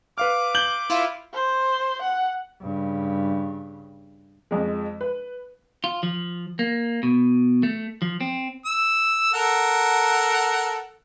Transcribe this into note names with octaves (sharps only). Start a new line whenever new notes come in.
B4 F5 D6 F6
G6 F#7 G7
E4 F4
C5
F#5
G2 C#3
F2 G#3
B4
F4
F3
A#3
B2
A3
F3
C4
E6
A4 A#4 F#5